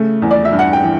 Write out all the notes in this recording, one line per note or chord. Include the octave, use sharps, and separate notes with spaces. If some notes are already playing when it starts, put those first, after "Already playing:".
Already playing: C#3 A3
E2
D5
E5
G2
F#5
G5
E3